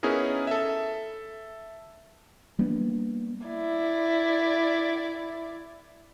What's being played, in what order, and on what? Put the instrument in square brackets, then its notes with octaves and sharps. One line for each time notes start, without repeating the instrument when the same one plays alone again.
[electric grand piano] B3 C#4 D#4 E4 G#4 A#4
A4 E5
[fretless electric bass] G3 A#3 B3 D4
[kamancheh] E4 D5